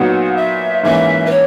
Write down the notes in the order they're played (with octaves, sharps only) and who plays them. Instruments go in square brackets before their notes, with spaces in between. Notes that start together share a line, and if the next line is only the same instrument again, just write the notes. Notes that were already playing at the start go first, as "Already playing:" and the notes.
Already playing: [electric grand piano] A#2 F#3 B3 D#4 [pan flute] F#5
[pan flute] E5
[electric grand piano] G#2 E3 A#3 C#4 [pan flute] E5
[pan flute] B4
C#5